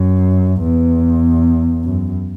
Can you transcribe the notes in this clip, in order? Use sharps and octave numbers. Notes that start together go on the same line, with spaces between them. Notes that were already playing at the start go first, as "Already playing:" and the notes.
Already playing: F#2
E2
F#2